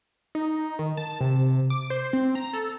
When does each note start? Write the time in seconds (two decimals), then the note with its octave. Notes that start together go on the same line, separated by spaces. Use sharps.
0.35 D#4
0.79 D#3
0.97 A5
1.21 C3
1.70 D6
1.90 C5
2.13 C4
2.35 A#5
2.53 A4